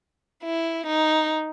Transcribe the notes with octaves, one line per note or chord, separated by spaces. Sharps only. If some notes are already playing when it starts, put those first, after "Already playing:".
E4
D#4